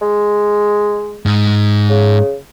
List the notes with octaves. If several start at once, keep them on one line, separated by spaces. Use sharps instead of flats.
G#3
G#2
C#3